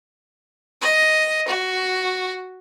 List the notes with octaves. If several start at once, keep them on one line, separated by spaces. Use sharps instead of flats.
D#5
F#4